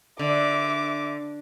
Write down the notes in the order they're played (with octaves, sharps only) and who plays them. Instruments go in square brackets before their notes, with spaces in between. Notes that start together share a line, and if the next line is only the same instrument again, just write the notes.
[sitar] D3 [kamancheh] E5 D6